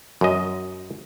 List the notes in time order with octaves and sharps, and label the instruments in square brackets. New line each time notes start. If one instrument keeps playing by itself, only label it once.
[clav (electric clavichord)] F#2 D#5